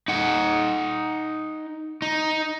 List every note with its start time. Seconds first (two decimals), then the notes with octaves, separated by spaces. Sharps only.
0.08 D#4 F#5
2.02 D#4